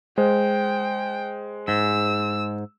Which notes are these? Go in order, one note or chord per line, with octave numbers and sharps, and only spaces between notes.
G#3 C5 G5
G#2 E6